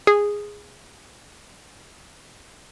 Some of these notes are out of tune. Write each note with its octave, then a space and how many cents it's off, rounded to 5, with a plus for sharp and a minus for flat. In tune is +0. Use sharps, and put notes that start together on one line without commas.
G#4 -10